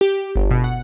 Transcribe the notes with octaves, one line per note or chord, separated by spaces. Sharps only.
G4
G1
B2
F#5